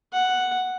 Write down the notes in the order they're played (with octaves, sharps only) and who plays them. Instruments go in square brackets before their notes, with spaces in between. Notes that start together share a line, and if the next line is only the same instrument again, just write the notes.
[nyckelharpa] F#5